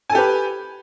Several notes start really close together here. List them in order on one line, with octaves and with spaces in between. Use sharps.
G#5 A4 G4 B4